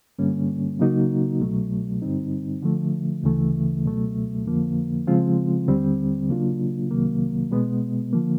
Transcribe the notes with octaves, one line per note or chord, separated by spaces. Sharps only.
G2 D3 G3 A#3 C#4
C#3 F#3 A#3 D#4 F#4
C2 B2 F#3 A3
G2 D3 G3 C4 D#4
D3 F3 A3
D2 C#3 E3 A3
C#2 B2 F#3 A3
F2 D3 F3 A#3
C#3 F3 G#3 C4 F4
D#2 D3 G3 C4
C#3 F#3 A#3 D4 F4
C2 C3 D#3 F#3 A#3
B2 G#3 B3
D3 F3 A#3